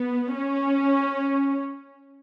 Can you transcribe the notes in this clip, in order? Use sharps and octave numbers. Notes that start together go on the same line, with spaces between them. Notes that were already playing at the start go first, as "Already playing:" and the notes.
Already playing: B3
C#4